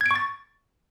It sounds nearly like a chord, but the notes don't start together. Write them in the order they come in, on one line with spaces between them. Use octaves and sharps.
G#6 D7 C#6 A6